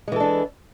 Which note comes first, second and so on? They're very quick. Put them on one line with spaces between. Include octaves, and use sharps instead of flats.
G#3 E3 A4 D4